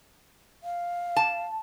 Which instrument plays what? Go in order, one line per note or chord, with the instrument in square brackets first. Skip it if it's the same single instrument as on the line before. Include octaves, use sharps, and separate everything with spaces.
[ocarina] F5
[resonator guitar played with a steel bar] A5